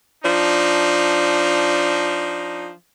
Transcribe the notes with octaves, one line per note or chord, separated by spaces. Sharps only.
F3 D4 D#4